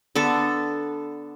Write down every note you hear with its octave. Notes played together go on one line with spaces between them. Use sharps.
D3 B3 A4